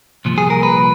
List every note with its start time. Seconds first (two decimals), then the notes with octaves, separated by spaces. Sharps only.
0.25 C2 A#2 F3
0.38 G#4
0.50 A#4
0.63 B4